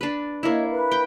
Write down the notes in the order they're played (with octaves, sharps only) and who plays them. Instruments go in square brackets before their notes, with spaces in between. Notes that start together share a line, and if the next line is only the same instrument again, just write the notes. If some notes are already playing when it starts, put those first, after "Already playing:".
[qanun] D4 B4
[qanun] A#3 E4 [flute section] C#5 D#5
[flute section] B4
[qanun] G5